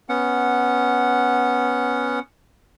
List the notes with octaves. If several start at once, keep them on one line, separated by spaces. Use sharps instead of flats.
B3 C#4 F#5